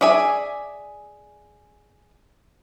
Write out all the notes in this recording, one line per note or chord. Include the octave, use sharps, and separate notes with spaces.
G#4 D5 E5 G#5